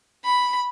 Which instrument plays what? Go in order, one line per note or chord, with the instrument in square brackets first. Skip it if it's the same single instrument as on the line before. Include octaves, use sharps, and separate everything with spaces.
[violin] B5